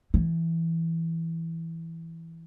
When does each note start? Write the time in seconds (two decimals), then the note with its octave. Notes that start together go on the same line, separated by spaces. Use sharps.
0.14 E3